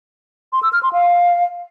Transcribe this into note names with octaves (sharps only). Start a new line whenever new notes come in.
C6
E6
F6
C6
F5